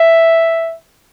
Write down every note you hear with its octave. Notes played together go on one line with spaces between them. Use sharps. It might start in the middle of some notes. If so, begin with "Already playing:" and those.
Already playing: E5